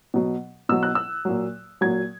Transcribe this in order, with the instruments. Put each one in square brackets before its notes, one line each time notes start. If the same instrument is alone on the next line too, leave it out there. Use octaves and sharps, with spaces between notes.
[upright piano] B2 F#3
B2 F#3 E6
F#6
E6
A#2 F#3
A#2 F#3 G#6